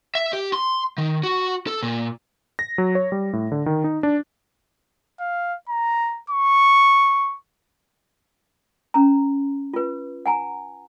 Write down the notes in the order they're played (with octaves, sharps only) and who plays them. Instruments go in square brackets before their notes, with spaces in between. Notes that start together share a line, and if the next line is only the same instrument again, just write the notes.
[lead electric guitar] E5
G4
C6
D#3
F#4
A4
A#2
[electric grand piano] A#6
F#3
C#5
G3
A2
D3
D#3
D#4
D4
[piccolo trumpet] F5
A#5
C#6
[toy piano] C#4 A#5
F4 B4
F#5 G#5 A#5